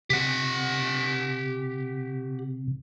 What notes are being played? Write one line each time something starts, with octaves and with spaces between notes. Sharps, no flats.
C3 G4 F#5